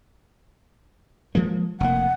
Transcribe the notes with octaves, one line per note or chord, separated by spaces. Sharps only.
F3 G#3 A#3
F1 A#3 F#5